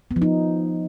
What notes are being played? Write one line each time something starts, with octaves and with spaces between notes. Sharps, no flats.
B3
F3
D#4